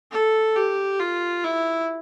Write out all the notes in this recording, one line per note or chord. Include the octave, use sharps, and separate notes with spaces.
A4
G4
F4
E4